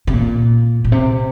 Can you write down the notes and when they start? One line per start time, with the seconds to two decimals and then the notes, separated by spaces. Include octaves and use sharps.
0.07 C3
0.13 A#2
0.85 A#2
0.92 C3